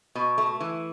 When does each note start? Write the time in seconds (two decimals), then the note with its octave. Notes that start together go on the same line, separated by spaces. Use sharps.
0.15 B2
0.38 A3
0.60 E3